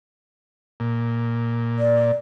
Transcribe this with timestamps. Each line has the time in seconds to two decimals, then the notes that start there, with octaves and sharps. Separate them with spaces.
0.80 A#2
1.79 D5